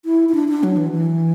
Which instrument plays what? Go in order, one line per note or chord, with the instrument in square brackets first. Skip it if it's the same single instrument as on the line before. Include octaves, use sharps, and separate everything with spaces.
[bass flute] E4
E4
D4
D4
F#3
E3
E3